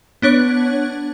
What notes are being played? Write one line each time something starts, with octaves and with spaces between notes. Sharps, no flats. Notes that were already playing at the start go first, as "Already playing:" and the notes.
B3 D4 C#5 F#6